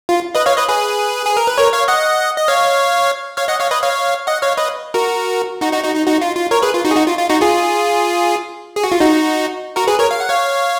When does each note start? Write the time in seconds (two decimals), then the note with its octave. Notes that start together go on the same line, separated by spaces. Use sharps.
0.09 F4
0.35 B4 D#5
0.46 C#5 F5
0.57 B4 D#5
0.68 G#4 B4
1.26 G#4
1.37 A#4
1.47 B4
1.58 A#4 C#5
1.73 C#5 F5
1.88 D#5 F#5
2.37 D#5
2.48 C#5 F5
3.37 C#5 F5
3.48 D#5 F#5
3.60 C#5 F5
3.71 B4 D#5
3.82 C#5 F5
4.27 D#5 F#5
4.42 C#5 F5
4.57 B4 D#5
4.94 F#4 A#4
5.61 D#4 F#4
5.73 D#4 F#4
5.84 D#4 F#4
5.95 D#4
6.07 D#4 F#4
6.21 F4
6.36 F4
6.51 A#4 C#5
6.62 G#4 B4
6.74 F4
6.85 D#4 F#4
6.91 G#4
6.96 D#4 F#4
7.07 F4
7.19 F4
7.30 D#4 F#4
7.41 F4 G#4
8.76 G#4
8.84 F#4
8.92 F4
9.00 D#4 F#4
9.76 F#4 A#4
9.87 G#4 B4
9.99 A#4 C#5
10.11 F5
10.20 F#5
10.29 C#5 F5